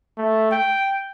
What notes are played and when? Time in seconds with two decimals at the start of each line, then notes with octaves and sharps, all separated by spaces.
0.18 A3
0.51 G5